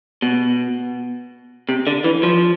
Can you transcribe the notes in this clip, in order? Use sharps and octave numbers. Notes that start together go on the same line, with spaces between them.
B2
C3
D3
E3
F3